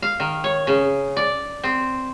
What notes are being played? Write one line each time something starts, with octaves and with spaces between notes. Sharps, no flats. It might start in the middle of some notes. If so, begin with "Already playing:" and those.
F5
D#3
C#5
C#3
D5
C4